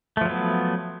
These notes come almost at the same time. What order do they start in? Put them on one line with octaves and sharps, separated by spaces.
A3 F3 F#3 B3